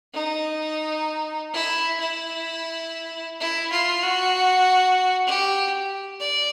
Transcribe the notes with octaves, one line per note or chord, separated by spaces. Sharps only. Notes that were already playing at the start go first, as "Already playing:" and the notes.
D#4
E4
E4
E4
F4
F#4
G4
D5